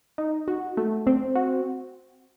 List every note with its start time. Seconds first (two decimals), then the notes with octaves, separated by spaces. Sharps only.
0.18 D#4
0.48 F#4
0.77 A3
1.07 C4
1.35 F#4